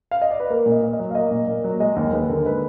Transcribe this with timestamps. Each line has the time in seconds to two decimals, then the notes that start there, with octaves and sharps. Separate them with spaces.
0.11 F5
0.22 D#5
0.31 D5
0.40 B4
0.50 A#3 A#4
0.66 A#2
0.72 D#5
0.82 A#2
0.93 D#5
0.99 F#3
1.11 F5
1.15 A#3 D#5
1.31 A#2
1.47 A#2
1.64 F#3
1.80 G#3 D#5
1.96 D#2
2.12 D#2 B4
2.29 D3 A#4
2.45 G#3 B4